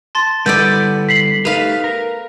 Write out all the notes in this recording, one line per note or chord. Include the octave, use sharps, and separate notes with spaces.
A5 C6 A6
D3 G3 B3 E4 A4 D5 G6 A6
B6 C7 F#7
A3 D#4 G4 B4 F5
A#4